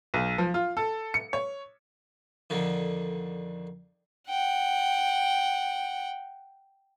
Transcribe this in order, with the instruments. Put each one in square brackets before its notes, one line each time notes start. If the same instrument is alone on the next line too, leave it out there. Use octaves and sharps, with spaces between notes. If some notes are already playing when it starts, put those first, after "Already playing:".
[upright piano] B1
F3
F4
A4
C#7
C#5
[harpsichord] F2 D3 D#3
[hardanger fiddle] F#5 G5